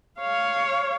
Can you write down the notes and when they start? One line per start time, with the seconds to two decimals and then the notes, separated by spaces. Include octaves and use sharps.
0.19 C#5 F5